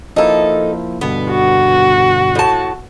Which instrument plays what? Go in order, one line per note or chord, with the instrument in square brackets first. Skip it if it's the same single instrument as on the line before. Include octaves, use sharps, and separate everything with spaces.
[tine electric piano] F3 A#3 E4 [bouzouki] D#4 A4
[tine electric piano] G2 B2 D3 [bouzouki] B3
[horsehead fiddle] F#4
[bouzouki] A2 A5